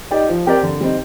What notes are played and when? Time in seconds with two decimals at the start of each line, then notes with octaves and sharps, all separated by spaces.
0.11 D#4 G4 D5
0.28 F3
0.46 C4 G4 A#4 D5
0.63 D3
0.80 G3 C4 D#4